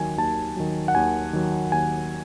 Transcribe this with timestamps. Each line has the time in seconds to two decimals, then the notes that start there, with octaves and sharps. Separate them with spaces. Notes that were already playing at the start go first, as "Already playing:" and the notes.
Already playing: D#2 D#3 F#3 G#5
0.18 D#2 A5
0.56 D#3 F#3
0.88 F#5
0.95 D#2 G#5
1.33 D#3 F#3
1.72 D#2 G#5